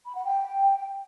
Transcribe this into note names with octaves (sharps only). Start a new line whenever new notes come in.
B5
F#5
G5